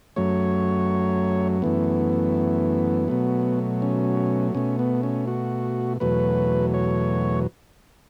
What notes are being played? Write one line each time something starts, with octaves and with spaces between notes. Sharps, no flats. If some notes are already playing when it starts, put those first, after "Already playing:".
F#2 F#3 A3 C#5
F#2 E3 A3 B3
B2 F#3 A3
C#4
B2 A3 C#4
B3
C#4
F#4
E2 B2 F#3 A3 B4
C#5